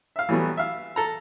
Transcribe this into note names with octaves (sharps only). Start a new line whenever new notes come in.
E5 F5
E3 F#3 G3 A3 B3
E5 F5
A4 A#5